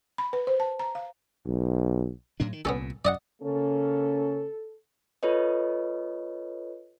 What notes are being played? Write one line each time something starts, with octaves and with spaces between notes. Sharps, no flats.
B5
B4
C5
A5
A#5
F5
B1
A2 F#3 D4
D#3
C2 A#2 B3 C#4 A4
F#2 D5 D#5 F#5
C#3 A#3 C#4 A4
F4 A4 B4 C#5 D#5